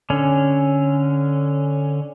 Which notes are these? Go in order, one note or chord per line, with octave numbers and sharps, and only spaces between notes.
D3 C#4